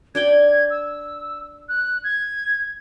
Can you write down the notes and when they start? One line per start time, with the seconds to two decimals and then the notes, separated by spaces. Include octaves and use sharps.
0.15 D4 D5 G5 G#6
0.70 E6
1.69 F#6
2.04 G#6